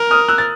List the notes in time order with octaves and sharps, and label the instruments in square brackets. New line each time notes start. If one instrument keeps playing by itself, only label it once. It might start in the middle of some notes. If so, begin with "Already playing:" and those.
Already playing: [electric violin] A#4
[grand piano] D#6 F6
E6 F#6
A6